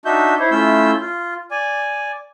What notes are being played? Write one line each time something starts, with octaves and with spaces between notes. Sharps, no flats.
D4 D#4 F#4 E5 G6
E4 C5 C#5
A3 C#4 E4 F4 E6 G6
F4
D5 G#5